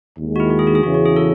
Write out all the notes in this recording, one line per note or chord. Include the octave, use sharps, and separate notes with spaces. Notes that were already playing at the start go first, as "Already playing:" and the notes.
D#2 D#3 G#3
F#4
E4
F#4
G#4
F#4
G#4
E2 C#3 E3 F#4
F#4
G#4
A4